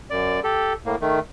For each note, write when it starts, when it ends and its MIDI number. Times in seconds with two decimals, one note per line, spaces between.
0.10 0.40 42
0.10 0.40 74
0.44 0.73 67
0.44 0.73 69
0.86 0.96 45
0.86 0.96 58
1.01 1.19 51
1.01 1.19 57